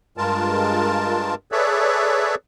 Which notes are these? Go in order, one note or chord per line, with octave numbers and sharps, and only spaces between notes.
G2 G#3 F4 A#4 A5
G#4 A4 B4 C#5 D5 E5